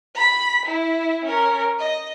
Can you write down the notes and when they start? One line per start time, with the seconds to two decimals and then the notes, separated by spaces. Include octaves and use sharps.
0.15 B5 B6
0.66 E4
1.25 C#4 A#4
1.79 D#5